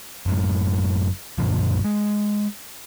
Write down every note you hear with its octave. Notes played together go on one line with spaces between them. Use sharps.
F#1 F#2 A2
F#2 A#2 D3 F3
G#3